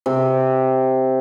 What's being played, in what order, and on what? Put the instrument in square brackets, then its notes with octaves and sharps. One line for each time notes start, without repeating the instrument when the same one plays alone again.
[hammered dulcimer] C3